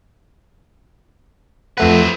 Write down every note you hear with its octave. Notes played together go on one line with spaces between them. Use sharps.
F2 A3 C4 B4 F#5